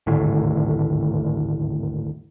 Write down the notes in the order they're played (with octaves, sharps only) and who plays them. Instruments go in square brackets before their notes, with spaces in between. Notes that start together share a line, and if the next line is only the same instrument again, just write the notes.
[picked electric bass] D#1 G#1 D2 A2